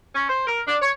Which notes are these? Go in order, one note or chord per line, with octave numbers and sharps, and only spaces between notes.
C#4
C5
A#4
D4
C#5